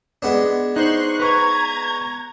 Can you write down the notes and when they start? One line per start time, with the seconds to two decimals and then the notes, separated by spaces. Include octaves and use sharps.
0.22 G#3 B3 D4
0.76 D#4 C5 C6 C#6 F#6
1.20 B4 A#5 C#6 G#6